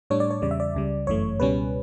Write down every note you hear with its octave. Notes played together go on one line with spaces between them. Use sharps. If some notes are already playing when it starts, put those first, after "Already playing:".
A2 G3 D4 C#5
D5
C#5
E2 C#3 G3 D5
E5
D5
C#2 C#3 G3
G1 F#2 E3 A3 C#5
C#2 B2 G3 C#4 B4